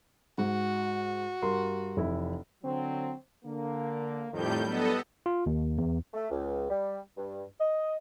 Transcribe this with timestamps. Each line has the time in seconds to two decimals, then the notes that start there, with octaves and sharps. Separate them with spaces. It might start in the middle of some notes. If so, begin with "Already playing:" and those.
0.38 G#2 F#4
1.42 G2 A#4 C6
1.97 F1 E3 E4
2.64 D3 F#3 C4
3.44 D3 A#3
4.32 F2 A2 D#3 G3 G6
4.66 F#3 B3 D4 A4 D#5
5.26 F4
5.46 D#2
5.78 E2
6.14 A3
6.31 C#2
6.70 G3
7.17 G2
7.60 D#5